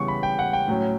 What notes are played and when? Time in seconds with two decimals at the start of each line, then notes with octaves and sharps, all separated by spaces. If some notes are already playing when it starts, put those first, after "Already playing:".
Already playing: C#3 E3 G3 B3 C#6
0.08 B5
0.23 G5
0.39 F#5
0.53 G5
0.68 A2 F#3 C#4